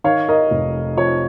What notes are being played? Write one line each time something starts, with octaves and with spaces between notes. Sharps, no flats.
D#3 C#5 F5
A#4 D#5
F1
F2 C#5